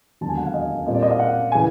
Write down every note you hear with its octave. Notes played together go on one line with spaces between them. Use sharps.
E1 D#2 D3 F#3 A5
G#5
F#5
F5
D#5
A#2 G3 C4 F4 D#5
D5
D#5
F5
F#5
C#3 E3 G#5